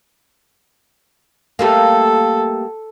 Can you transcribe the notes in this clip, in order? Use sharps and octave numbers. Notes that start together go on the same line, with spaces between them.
G3 A3 A#3 A4